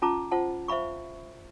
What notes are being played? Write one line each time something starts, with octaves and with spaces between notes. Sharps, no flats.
C#4 F4 A5 A#5 D6
F4 C5 F#5 A5
C5 E5 F5 B5 C#6